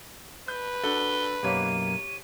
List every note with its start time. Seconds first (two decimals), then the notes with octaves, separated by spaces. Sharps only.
0.48 B4 G6
0.83 D4 F#4 A4 G7
1.43 B1 F#2 A#3 G4 C#5 D#7